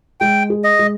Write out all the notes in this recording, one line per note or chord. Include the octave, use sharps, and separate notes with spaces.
G#3 G5
G#4
D#5
G#3